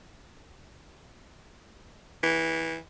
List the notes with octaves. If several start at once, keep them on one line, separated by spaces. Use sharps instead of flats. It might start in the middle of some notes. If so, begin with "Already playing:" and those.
E3